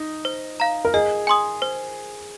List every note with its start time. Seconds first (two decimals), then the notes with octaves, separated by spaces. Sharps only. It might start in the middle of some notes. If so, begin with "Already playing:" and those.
Already playing: D#4
0.25 C5
0.60 F5 A#5
0.85 A#4
0.94 G#4 D#5
1.27 G#5 C6 D#6
1.62 C5